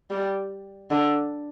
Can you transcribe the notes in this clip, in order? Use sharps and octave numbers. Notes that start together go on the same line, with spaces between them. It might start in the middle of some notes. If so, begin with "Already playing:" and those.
G3
D3